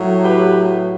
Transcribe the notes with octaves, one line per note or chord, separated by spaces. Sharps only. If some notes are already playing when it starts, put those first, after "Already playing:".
Already playing: A2 F#3
G4 B4